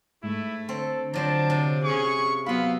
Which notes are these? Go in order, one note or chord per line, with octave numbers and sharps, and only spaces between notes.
G#2 A3 E4
D3 C4 A4
F3 F#3 D4 C5 A5
C3
C#4 G#4 C#6
F#3 B3 E4 F5 B5 C6